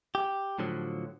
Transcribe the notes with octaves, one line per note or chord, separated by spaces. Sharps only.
G4
A2 D3 F3 F#3